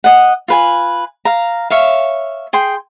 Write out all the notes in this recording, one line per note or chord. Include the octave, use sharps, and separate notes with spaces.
D#5 F#5
F4 B4 G#5
F5 A#5
C#5 E5 F5
G#4 G5 C6